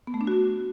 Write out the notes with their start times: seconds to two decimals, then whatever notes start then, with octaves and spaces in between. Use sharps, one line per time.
0.07 B3
0.14 A3
0.21 D4
0.27 F#4